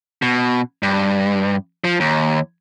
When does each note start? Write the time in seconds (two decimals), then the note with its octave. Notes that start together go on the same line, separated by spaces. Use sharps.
0.22 B2
0.83 G2
1.84 F3
2.00 D#2